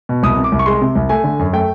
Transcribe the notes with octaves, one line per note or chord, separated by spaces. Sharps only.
B2
C2 D#6
C3
D6
C2
C#6
G#3 C6
C3
C2
A3 G#5
D3
F#2
A3 G5